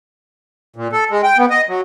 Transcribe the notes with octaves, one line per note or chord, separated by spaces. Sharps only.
A#2
A4
G#3
G5
B3
D#5
F#3